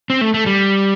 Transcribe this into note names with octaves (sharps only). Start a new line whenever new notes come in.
C4
A3
A3
G3